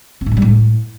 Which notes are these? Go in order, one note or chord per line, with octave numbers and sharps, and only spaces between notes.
C4
A2
G#3
G3
A2